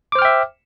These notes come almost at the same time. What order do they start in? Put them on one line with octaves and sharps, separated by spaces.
D6 C5 F6 G5 E5